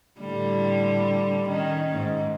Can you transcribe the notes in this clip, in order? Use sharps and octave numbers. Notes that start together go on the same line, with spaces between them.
A2 D3 G3
D#3 C#4
G#2